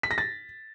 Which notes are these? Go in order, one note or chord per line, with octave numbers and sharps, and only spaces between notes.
B6
A#6
A6